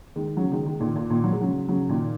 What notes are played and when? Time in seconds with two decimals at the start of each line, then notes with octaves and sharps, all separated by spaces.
0.16 D#3 G#3
0.37 C#3 F#3
0.52 D#3 G#3
0.66 D#3 G#3
0.80 A#2 D#3
0.96 A#2
1.10 A#2 D#3
1.24 F#3
1.33 G#3
1.41 C#3 F#3
1.68 C#3 F#3
1.89 A#2 D#3